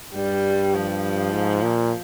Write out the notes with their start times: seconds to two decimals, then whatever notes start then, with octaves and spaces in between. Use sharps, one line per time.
0.15 G2 G3
0.74 F3
1.33 G#2
1.62 A#2